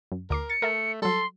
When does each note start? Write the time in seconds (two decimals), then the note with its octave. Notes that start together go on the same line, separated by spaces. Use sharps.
0.12 F#2
0.30 D2 A#4 D6 C7
0.50 A6 C#7
0.62 A3 A#4 E5 A5
1.02 F#3 G3 A4 C6